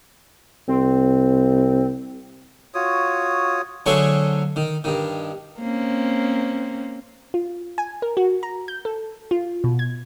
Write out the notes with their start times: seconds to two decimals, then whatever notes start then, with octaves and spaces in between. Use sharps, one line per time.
0.68 C2 C4
2.75 F4 F#4 C#5 D#6
3.86 D3 F#3 A3 G#4 C5 C#6
4.56 D#3
4.84 G2 D#3
5.60 A#3 C4 C#4
7.34 F4
7.78 G#5
8.02 A#4
8.17 F#4
8.43 A#5
8.68 G6
8.85 A4
9.31 F4
9.64 B2
9.79 G#6